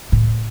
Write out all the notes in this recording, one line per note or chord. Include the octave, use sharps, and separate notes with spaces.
A2